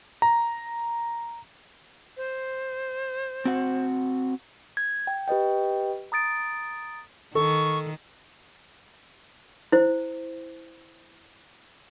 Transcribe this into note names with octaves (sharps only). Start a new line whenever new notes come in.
A#5
C5
C4 F#4 F#5
G#6
G5
G4 B4 D#5 G5
A#5 D#6 A6 D7
D#3 A4 C#6
E4 C5